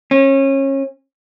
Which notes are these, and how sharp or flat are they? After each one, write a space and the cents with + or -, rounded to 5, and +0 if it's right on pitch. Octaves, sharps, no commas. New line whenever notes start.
C#4 -30